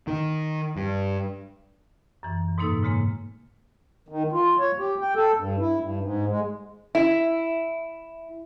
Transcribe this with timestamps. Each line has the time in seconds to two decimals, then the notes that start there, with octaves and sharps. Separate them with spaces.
0.07 D#3
0.76 G2
2.23 F#2 E3
2.58 G#2 B2 A#3 D#4 A4 E6
2.83 G#2 C#3 G#3 A#3
4.08 D#3
4.32 F4
4.59 C#5
4.79 G4
5.01 G5
5.15 A4
5.37 G2
5.60 E4
5.79 G2
6.02 G#2
6.29 G#3
6.95 E4